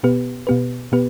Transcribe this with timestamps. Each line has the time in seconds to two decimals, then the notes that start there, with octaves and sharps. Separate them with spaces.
0.03 B2 B3 G4 B4
0.47 B2 B3 G4 B4
0.92 B2 B3 G4 B4